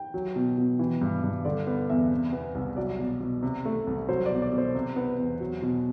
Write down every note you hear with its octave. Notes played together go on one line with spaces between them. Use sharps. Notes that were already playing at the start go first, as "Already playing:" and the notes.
Already playing: G5
F#3
B2
B2
E3
G2
G2
D3 D5
B3
E2 E5
C3
B3
C2
F#3 D5
B2
B2
C3
A3
C2
F#3 C5
D5
B2
D5
B2
C5
C3
B3
E2
F#3
B2